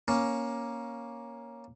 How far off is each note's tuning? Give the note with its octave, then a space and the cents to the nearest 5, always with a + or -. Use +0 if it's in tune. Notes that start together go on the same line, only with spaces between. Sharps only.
A#3 +10 C#4 +0